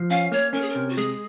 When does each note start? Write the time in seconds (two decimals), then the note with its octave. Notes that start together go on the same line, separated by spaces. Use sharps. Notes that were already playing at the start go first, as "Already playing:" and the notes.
Already playing: F3
0.10 C#4 F5
0.32 A#3 C#5
0.53 C#4 A#4
0.62 G#4
0.69 A#4
0.75 C3
0.89 F#4
0.96 G#3 G#4